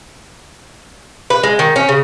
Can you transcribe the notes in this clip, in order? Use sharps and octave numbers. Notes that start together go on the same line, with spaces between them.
B4
G#3
D#3
C#4
C#3